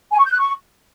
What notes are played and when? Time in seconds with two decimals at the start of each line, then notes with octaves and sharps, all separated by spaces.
0.11 G#5
0.18 C#6
0.25 G6
0.32 F#6
0.38 C#6